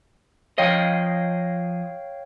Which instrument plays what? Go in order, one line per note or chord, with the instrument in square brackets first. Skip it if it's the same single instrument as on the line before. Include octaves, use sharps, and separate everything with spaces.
[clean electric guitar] F3 D#5 [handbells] C#5 F5 G5